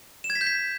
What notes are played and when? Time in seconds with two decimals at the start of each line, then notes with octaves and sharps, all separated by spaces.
0.24 E7
0.30 G#6
0.35 B6
0.41 G6
0.47 B6